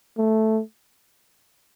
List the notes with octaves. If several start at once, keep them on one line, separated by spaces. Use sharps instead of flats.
A3